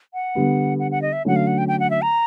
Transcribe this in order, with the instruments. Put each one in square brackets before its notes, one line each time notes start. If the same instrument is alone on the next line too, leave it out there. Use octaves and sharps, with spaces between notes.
[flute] F#5
[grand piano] D3 G3 B3
[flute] F#5
F#5
D#5
E5
[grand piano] D3 F#3 A3 C#4 [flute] F#5
[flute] F5
F#5
G5
G5
F#5
E5
A#5